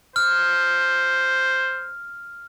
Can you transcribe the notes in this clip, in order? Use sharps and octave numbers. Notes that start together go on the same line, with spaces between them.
C5 F6